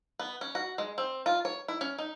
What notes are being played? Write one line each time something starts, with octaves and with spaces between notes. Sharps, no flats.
B3
C#4
F#4
G#3
C4
F4
C#5
E4
C#4
D#4